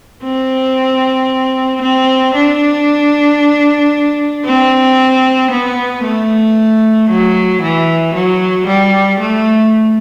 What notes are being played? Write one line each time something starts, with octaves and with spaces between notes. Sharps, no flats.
C4
C4
D4
C4
B3
A3
F#3
E3
F#3
G3
A3